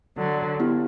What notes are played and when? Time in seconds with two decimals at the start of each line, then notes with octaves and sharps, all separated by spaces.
0.17 D3 F#3
0.60 B3 E4 G4